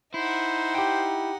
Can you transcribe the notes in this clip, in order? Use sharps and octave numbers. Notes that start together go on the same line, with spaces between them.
D#4 E4 C5 F#5
G4 G5